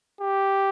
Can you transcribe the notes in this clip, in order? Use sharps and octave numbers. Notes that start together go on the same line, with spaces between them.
G4